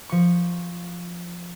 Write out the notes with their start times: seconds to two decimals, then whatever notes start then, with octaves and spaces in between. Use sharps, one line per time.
0.09 F3 C#6